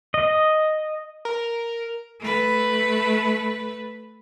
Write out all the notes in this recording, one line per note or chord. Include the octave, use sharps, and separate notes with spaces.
D#5
A#4
A3 B4